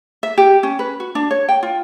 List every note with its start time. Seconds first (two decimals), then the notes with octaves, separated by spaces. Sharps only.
0.23 E5
0.38 G4
0.63 C#4
0.79 B4
1.00 F#4
1.15 D4
1.31 C#5
1.49 G5
1.63 F4